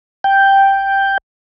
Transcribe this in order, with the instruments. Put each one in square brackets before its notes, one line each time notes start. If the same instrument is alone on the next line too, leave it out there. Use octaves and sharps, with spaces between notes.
[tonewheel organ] G5